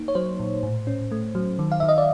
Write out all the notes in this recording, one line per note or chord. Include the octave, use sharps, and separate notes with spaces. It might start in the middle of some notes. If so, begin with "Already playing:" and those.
Already playing: A#3 D#4
C#5
F#3 C5
A#2
A2
C#4
A3
F#3
D#3
F5
D#3 E5
D#5
D5